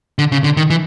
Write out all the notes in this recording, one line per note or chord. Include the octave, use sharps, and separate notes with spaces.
D3
C#3
D3
D#3
E3